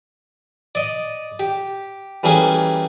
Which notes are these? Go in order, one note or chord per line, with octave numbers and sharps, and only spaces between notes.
D5 D#5
G4
E3 G3 A3 A#3 C#4 G#4